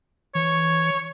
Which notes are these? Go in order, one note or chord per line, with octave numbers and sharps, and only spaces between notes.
E3 C#5